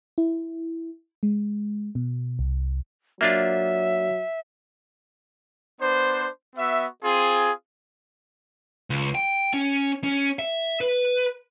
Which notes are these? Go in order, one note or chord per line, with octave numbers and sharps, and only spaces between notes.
E4
G#3
B2
C2
F#3 A#3 D4 F4 E5
B3 D4 C5
B3 F#4 E5
C4 F4 G#4
C#2
G5
C#4
C#4
E5
B4